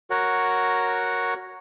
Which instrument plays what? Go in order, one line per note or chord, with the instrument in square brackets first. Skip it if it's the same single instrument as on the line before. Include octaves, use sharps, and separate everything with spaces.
[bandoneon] F#4 A#4 C#5 F#5